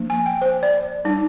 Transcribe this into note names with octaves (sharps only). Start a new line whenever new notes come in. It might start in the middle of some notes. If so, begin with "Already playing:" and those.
Already playing: F3 A#3 D4
G#5
G5
C5
D5
G3 D4 D#4